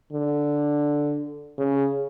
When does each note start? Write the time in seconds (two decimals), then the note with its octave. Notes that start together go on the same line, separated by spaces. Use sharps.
0.12 D3
1.58 C#3